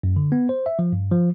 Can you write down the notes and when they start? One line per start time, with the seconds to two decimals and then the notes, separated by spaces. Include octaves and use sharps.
0.03 F#2
0.16 D3
0.32 B3
0.49 C5
0.66 E5
0.79 F3
0.92 G2
1.11 F3